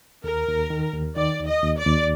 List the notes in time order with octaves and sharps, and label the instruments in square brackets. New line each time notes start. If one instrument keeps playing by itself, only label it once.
[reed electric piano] D#2 [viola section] A#4
[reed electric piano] D#2
D#3
D#2
[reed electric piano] D#3 [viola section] D5
[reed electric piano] D#2
[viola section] D#5
[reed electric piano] D#2
[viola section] D5
[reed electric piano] D#2